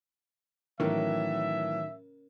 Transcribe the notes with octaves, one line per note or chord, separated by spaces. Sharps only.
A2 D#3 E3 F#3 C#4 A#4 E5